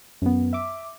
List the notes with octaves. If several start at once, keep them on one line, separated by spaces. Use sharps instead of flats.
F#2 B3
E5 D6